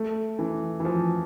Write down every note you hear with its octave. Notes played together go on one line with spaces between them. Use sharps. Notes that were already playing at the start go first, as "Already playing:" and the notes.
Already playing: A3
E3
E3
F3